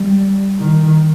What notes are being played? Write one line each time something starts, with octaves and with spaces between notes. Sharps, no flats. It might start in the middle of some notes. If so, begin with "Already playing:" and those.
Already playing: G3
D#3